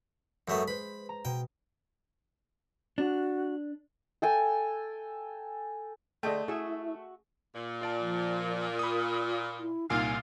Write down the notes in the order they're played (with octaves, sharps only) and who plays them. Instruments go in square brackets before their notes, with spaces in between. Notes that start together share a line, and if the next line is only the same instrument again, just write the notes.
[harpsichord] F#2 A3 B3 [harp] G#3
[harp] B4 C5 [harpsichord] B5
[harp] A#5
[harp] B2 [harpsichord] G5
[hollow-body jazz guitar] D4 [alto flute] F#4
[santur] A4 G5 G#5
[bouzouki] D3 G#3 [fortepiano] A3 [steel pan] A4 D#5 G5
[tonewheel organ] E4 [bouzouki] F#4 E5 [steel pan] G#4 C#6
[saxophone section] A#2
[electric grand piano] F4 D5 A5
[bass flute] F3
[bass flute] F4 [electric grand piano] B5 D#6
[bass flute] E4
[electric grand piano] C2 A#2 G#5 [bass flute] D#4 [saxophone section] F4 F5